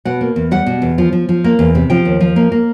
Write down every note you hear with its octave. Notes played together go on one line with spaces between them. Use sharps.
B2 F#5
A#3
E2
G3 F#5
B2
E2
F3
F3
F3
A#3
E2
C3
F3 G5
D#2
F3
A#3
A#3